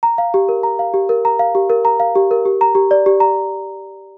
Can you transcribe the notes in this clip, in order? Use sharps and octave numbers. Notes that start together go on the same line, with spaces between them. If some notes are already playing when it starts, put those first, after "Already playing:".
A#5
F5
G4
A#4
A#5
F5
G4
A#4
A#5
F5
G4
A#4
A#5
F5
G4
A#4
G4
A#5
G4
D5
G4
A#5